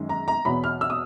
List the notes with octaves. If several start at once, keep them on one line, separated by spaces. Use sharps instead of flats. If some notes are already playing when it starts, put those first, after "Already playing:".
Already playing: F#2 D#3 G#3
A#5
A#5
E2 B2 F#3 B5
F6
E6
D#6